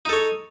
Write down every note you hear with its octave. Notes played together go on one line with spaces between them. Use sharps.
D#4 A4 C#5